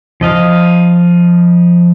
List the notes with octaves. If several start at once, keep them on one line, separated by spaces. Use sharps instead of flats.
F3 D#5 F5